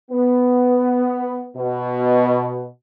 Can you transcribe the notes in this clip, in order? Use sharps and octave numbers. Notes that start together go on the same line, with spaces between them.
B3
B2